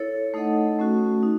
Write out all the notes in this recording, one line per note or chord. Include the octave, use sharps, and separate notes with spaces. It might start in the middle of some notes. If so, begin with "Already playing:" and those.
Already playing: E4 A4 C#5
A3 D#4 A4 D#5 F#5
A3 C#4 F#4
D#4